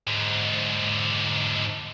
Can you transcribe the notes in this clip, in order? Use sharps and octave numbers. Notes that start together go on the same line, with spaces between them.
G#2 D3